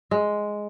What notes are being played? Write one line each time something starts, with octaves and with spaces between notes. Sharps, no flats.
G#3